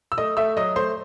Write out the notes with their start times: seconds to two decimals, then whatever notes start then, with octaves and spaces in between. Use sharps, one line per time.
0.12 E6
0.18 A3 D#5 D#6
0.37 A3 E5 E6
0.57 F#3 D#5 D#6
0.76 A3 C5 C6